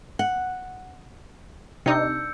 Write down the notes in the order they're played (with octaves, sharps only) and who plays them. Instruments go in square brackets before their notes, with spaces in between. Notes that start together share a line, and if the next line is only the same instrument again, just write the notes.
[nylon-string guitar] F#5
[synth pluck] C3 D#4 [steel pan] D4 [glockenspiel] E6 G6 C#7